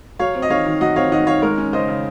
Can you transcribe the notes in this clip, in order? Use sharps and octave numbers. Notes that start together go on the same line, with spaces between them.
F#3 C#5 F5
C4
D#5
D#3 C#5 F5
D#3
F#3 D#5 F#5
C4 C#5 F5
D#3 D#5 F#5
D#3 C#5 F5
G#3 A#4 C#5
C#4
C#3 C5 D#5
C#3